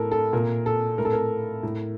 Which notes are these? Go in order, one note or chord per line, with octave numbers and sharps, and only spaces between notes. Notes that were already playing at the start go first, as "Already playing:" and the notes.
Already playing: A2 A4 A#4
A4
A#2 A#4
A4
A2 A#4
A4
A#4
A2